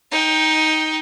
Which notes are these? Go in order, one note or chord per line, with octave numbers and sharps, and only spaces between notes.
D#4 G5